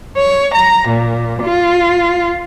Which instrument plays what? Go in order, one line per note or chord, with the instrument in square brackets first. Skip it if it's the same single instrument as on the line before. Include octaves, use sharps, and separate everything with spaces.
[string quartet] C#5
A#5
A#2
F4